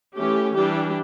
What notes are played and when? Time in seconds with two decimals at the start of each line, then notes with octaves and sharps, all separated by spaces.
0.16 E3 A3 C#4 G4
0.54 E3 G3 D4 G4